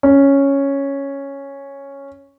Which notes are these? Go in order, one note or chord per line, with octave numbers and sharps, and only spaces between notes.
C#4